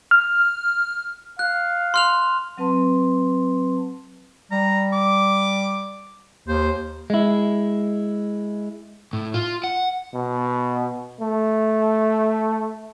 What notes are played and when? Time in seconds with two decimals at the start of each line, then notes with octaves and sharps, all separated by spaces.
0.11 F6
1.39 F5 F#6
1.94 C6 F6 F7
2.57 F#3 C4 B4 A5 C6
4.52 G3 A#5
4.93 D6
6.48 D#2 C5
7.10 G#3 E4
9.13 A2
9.34 F4
9.64 F#5
10.14 B2
11.21 A3